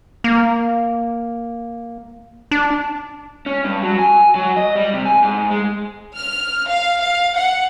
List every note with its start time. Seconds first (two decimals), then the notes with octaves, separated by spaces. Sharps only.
0.24 A#3
2.51 D4
3.46 C#4
3.64 G2
3.83 F#3
3.99 G#5
4.35 F#3
4.56 D#5
4.76 G3
4.93 C3
5.05 G#5
5.22 G#2
5.50 G#3
6.17 F6
6.69 F5
7.01 F5
7.36 F#5